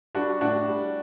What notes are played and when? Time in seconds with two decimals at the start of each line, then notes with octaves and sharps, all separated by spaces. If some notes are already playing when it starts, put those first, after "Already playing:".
0.15 G3 D4 F#4
0.41 A2 D4 F#4
0.68 G3